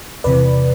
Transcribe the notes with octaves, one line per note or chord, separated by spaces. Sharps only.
E2 C3 E3 B4 D5